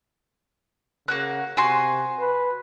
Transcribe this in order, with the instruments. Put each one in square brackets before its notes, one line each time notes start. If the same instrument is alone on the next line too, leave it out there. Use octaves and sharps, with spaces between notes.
[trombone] C#3 [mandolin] A#3 F#4 F#6
[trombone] C3 [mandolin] F#4 G#5 C6
[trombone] B4